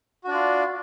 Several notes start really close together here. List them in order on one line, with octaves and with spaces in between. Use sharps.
F#4 D4 D5 F4